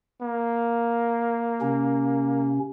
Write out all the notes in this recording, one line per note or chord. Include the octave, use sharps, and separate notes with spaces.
A#3
C3 C#4